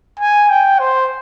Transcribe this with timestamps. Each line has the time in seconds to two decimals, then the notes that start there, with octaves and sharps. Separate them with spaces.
0.19 G#5
0.50 G5
0.79 C5